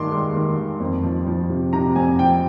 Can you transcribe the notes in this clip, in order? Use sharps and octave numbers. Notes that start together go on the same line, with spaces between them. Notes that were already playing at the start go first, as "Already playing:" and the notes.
Already playing: G2 D#3 C6 D6
G#3
D#3
D#3
F2
F3
F3
C3
C3 A#5
F2 G#5
F3 G5